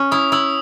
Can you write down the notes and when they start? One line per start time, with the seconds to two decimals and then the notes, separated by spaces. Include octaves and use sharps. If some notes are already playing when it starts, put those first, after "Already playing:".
Already playing: C#4
0.11 E4 D#6
0.32 E4 E6